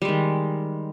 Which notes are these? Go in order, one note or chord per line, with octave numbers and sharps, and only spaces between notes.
D#3 G3 G#3